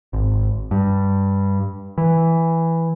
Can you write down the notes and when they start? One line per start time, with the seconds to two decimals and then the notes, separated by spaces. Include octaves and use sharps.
0.13 G#1
0.71 G2
1.98 E3